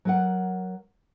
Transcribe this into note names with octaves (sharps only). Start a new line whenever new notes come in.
F#3 A#4 F#5